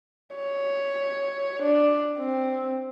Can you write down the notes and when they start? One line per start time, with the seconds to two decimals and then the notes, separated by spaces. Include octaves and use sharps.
0.35 C#5
1.63 D4
2.18 C4